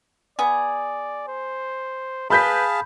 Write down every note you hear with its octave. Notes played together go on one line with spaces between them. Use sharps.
B3 G#4 D5
C5
G#4 B4 F5 A5 B5 G6 B6